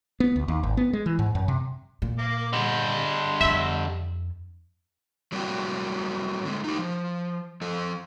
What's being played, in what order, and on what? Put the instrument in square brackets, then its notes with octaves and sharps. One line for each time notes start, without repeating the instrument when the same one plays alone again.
[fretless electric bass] B3
D2
D#2
G#1
B3
G#3
E3
G#2
F#2
C3
[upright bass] A#2
[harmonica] A#3 A#4 D6
[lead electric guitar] D3 G3 [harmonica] D#5 C6
[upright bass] F2 D4 [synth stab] E5
[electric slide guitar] F#3 G3 A#3 C4 F#4 G4
D3 G3 G#3
D#4 G4
F3
F3 A4